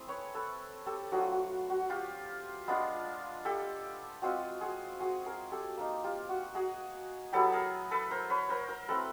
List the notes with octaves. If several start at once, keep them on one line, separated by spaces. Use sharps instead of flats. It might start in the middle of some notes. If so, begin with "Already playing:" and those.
Already playing: A3 C4 E4 G#4
B4 C#5
A4 B4
G4 A4
F#3 A3 D4 F4 F#4 G#4
F#4
F#4
F4 G4
G#3 B3 D4 F4
G4 A4
G#3 C4 F4 F#4 G#4
F#4 G#4
F#4 G#4
G#4 A#4
G4 A4
A#3 D#4
F4 G4
F#4
F#4 G#4
F#3 B3 E4 G4 A4
G#4 A#4
A4 B4
A#4 C5
B4 C#5
A#4 C5
A#4 C5
A3 C4 E4 A4 B4